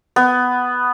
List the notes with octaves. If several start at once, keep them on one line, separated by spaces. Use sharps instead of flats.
B3